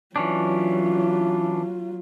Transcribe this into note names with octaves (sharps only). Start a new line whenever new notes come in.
E3 F#3 C#4 D4 F4